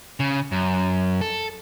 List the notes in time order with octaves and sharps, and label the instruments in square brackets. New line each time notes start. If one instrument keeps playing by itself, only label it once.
[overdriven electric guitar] C#3
F#2
A4